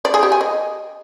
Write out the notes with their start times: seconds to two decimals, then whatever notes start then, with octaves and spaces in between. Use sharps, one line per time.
0.05 D5
0.14 G#4
0.23 G4
0.32 G#5
0.41 D#5